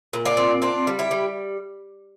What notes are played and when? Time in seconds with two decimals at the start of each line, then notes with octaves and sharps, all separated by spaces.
0.13 A#2
0.25 D4 F4
0.37 C4
0.62 C4 D4 F4
0.87 G3
0.99 E4 G4
1.11 G3